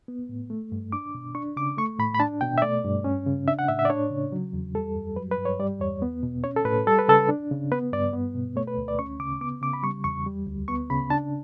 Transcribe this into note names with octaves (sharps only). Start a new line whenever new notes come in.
B3
A2
A3
G2
D4 D6
B2
D4 C#6
C#3 D6
A3 C#6
A2 B5
B5
D4 A5
B2 G5
E5
A3 D5
G2
C#4
C#3
D4 E5
F#5
A2 E5
E5
D5
D4 C#5
C#3
F#3
E2
G3 A4
F#2
F#3 B4
B4
G2
C#5
G3 D5
E2 C#5
B3
B2
C#4 C#5
A4
A2 B4
G3 A4
B4
C#3 A4
D4
C#3
B3 B4
G2 D5
B3
B2
A3 C#5
B4
D2
D5
C#4 C#6
C#3 D6
B3 D6
C#3 D6
B5
G3 C#6
E2 C#6
G3
D2
B3 C#6
C#3 B5
D4 A5